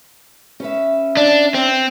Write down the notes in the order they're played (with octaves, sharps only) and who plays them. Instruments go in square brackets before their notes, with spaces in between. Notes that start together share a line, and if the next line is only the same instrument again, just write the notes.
[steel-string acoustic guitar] C#4 B4 E5
[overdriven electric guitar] D4
C4